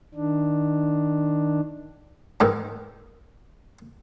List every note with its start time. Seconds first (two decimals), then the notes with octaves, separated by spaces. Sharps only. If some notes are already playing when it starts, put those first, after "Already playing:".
0.14 D#3 D4
2.40 G#2 D#3 E3